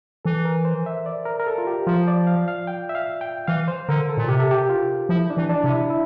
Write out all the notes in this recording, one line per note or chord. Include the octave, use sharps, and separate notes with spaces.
E3 A4
A#4
C5
E5
D5
A#4
A#4
A4
F4
G4
F3 F4
D5
F5
F5
G5
E5
F5
G5
E3 F5
C5
D3 A#4
A4
A#2
C3 G4
A4
G4
F4
F3 E4
D4
E3
D4
C3
E4
E4